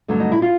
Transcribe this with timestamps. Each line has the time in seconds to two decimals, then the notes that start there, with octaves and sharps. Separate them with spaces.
0.08 G2 D3 F#3 A3
0.20 D#4
0.32 E4
0.42 F4